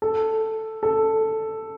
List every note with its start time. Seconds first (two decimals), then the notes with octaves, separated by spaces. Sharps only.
0.02 A4
0.83 A4